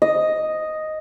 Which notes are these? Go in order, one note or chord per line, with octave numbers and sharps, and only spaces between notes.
D#5